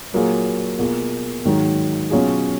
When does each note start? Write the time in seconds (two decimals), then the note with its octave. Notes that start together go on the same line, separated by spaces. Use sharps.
0.12 A#2 F#3 A#3 F4 G#4
0.79 B2 A#3 F4 G#4
1.45 G#2 D#3 F#3 A#3 D#4
2.10 B2 F#3 C#4 F4 G#4